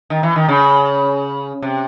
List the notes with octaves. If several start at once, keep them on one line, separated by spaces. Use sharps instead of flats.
D#3
E3
D#3
C#3
C3